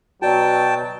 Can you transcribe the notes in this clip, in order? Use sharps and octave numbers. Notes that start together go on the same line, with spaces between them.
B2 F#3 F#4 D5 G5 A5